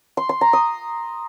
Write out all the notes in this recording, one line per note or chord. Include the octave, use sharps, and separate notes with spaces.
C6
C6
A#5
D#6